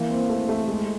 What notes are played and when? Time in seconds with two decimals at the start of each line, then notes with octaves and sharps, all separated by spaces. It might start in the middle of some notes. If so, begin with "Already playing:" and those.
Already playing: E3 A#3
0.10 C4
0.29 A3
0.49 A3
0.68 G#3